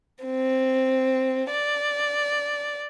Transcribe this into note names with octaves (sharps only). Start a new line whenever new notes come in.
C4
D5